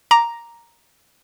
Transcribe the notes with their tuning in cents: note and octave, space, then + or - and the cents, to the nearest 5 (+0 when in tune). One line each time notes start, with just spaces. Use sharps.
A#5 +0 D6 +0